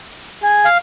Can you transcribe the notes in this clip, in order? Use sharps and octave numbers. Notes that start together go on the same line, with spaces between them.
G#4
F5